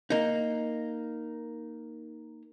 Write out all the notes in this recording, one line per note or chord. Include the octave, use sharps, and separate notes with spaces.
A#3 D#4